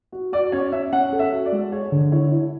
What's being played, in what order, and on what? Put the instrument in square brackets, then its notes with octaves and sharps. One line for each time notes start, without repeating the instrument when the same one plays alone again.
[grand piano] F#4
[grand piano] F#4 [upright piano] D5
[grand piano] C#4 [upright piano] C#5
[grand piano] C#4 [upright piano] E5
[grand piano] C#4 [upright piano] F#5
[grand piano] A4
[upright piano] E5
[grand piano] F#4
[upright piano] D5
[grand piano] G#3
[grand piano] G#4 [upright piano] C#5
[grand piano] D3
[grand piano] E4 [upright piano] C#5
[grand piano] E4